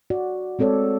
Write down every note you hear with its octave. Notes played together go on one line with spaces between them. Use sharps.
F#4 D5
G#3 C4 A4 C#5 D5